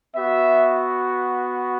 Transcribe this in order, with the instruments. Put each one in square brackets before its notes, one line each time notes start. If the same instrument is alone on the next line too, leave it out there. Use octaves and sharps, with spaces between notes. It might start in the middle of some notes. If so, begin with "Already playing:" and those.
[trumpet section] B3 F#4 E5